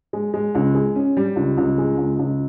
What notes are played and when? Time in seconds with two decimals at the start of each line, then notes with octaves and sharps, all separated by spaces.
0.13 G#3
0.34 G#3
0.55 C#2
0.75 G#3
0.96 C#4
1.17 G3
1.36 C#2
1.57 C#2
1.78 G#3
1.98 C#2
2.19 C#2